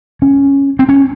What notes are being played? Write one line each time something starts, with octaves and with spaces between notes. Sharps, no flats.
C#4
C4
C#4